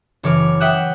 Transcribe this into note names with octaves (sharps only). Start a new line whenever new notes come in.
F#1 E3 C#5 D6 F6
E5 F#5 G5 D#6 E6 F#6